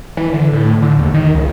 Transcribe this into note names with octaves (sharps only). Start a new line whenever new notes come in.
E3
D3
A2
D3
D#2
D#3
C#2